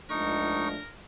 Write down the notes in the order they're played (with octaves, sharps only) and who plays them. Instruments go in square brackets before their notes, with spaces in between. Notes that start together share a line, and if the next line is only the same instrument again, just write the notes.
[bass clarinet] C#2 [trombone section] F3 A3 D4 [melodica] D#4 C#6 [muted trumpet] A#4